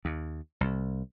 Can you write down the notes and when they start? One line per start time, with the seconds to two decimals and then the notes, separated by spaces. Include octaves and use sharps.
0.05 D#2
0.61 C2